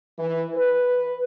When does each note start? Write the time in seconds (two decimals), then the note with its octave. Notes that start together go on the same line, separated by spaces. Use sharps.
0.18 E3
0.55 B4